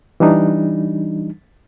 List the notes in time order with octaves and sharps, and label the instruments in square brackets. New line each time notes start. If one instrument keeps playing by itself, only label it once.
[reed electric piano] E3 G3 D4 D#4